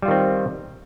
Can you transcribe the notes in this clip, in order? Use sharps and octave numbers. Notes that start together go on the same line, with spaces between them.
D#3 G3 C4 F4